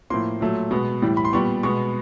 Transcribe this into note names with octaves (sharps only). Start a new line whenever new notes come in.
A2 F3 A#3 C6
A#2 F#3 A3
B2 G#3 B3
A2 E3 G3
B5
C6
A#2 G3 B3 C#6
B2 G#3 B3 C#6